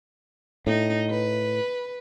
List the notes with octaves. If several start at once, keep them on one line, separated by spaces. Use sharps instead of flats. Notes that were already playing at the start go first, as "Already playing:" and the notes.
A2 D#4
B4